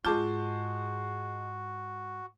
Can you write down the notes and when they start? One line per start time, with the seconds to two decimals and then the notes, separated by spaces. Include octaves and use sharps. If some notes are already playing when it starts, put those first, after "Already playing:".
0.05 G#2 G#3 F4 F#4 A5 D6 G6